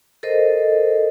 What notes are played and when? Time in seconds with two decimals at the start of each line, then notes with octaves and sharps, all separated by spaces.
0.23 A4 A#4 C5 D#5